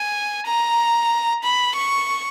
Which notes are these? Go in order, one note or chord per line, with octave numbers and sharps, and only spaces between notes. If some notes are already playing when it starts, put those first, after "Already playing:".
Already playing: G#5
A#5
B5
C#6